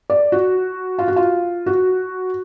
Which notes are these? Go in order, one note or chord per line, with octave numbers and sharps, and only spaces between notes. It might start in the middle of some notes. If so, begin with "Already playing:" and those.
D5
F#4
F4
F#4
F4
F#4